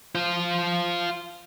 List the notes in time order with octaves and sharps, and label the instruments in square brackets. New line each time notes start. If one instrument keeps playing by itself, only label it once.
[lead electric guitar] F4 C5